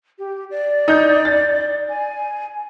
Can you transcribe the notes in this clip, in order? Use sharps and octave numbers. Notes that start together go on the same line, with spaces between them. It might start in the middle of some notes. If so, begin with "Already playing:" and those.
G4
D5
D#4 G6
A6
G#5